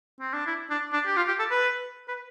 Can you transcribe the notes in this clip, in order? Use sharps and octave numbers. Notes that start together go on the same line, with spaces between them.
C4
D4
E4
D4
D4
G4
F4
G4
A4
B4
B4